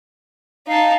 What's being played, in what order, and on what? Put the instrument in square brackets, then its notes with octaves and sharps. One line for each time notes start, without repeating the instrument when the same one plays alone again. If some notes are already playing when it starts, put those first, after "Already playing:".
[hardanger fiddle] D#4 A5 [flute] F5